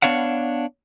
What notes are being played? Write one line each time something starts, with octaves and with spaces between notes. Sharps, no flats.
B3 D4 C#5 F5 F#5